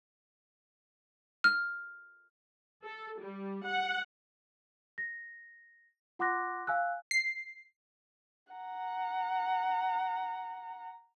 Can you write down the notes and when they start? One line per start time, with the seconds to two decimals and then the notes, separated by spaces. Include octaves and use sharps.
1.44 F6
2.83 A4
3.20 G3
3.65 F#5
4.98 A#6
6.19 F4 F#5 C6 D6 F#6 A#6
6.67 F5 G#5 E6 F#6
7.11 C7
8.53 F#5 A#5